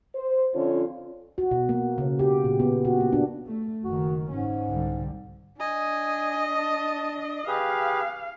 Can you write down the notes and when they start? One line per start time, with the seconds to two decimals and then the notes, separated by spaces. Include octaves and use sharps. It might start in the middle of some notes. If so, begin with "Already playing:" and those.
0.15 C5
0.54 F2 D3 C#4 F4 C#5
1.38 F#4
1.51 B2
1.69 A#3
1.98 C#3
2.19 G4
2.44 A#2
2.60 B3
2.85 F#4
3.00 A#3
3.13 D4
3.46 A3
3.84 F#1 D#3 F#4
4.31 G#2 C#4
4.67 C2 D3 G3
5.60 D4 D#5 G#5
6.59 A5
7.48 G4 G#4 B4 F5